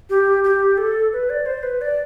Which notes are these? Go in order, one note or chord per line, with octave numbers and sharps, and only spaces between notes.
G4
G4
A4
B4
D5
C5
B4
D5